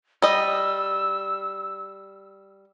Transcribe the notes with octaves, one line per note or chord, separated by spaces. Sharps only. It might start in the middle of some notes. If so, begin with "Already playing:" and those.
G3 D#5 E6